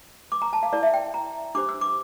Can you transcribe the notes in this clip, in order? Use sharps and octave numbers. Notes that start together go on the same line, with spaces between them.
D6
A#5
A5
F5
E4 A#4 D5
E5
G5
A#5
D4 G4 C5 D6
E6
D6